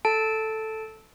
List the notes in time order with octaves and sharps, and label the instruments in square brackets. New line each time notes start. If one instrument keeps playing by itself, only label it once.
[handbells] A4 A5 D7